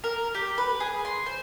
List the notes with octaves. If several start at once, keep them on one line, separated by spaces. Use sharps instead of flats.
A#4
G4
B4
G#4
C6
C5